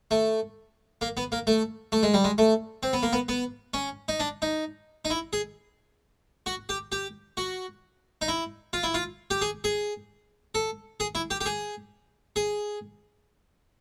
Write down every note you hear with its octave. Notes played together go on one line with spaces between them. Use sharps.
A3
A#3
B3
A#3
A3
A3
G#3
G3
G#3
A3
C4
B3
A#3
B3
B3
C#4
D#4
D4
D#4
D#4
E4
G#4
F#4
G4
G4
F#4
D#4
E4
F4
E4
F4
G4
G#4
G#4
A4
G#4
E4
G4
G4
G#4
G#4